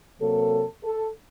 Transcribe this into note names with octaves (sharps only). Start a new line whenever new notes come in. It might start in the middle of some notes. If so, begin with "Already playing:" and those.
C3 F#3 A#3 A4
A4